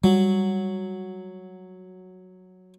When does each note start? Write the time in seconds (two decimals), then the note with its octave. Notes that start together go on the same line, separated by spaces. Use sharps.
0.04 F#3 G3